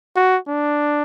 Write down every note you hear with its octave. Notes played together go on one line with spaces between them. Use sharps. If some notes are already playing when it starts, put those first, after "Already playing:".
F#4
D4